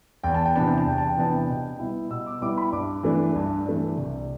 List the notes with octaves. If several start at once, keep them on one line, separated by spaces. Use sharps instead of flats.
E2 G5
A5
G5
C3 E3 B3 D4 A5
G5
A5
E2 G5
A5
G5
C3 E3 B3 D4 A5
G5
A5
B2 G5
G3 B3 E4
B2 E6
D6
G3 B3 E4 D6
B5
G2 D6
E3 A3 D4
G2
E3 A3 D4
C2